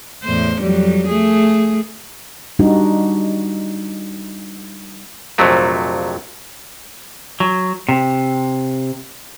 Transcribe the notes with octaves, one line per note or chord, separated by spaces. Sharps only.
E2 A2 C5
F2 F#3 G3
A3 G#4
G3 D4 D#4 F#4
A#1 F2 C3 F#3 A3
F#3
C3